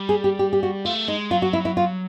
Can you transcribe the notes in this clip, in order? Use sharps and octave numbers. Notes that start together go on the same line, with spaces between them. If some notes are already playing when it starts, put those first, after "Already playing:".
Already playing: G3
G#4
G4
G4
G4
F#4
A3 F4
G#3 D#4
F#3 F4
F#4
E4
E4
F4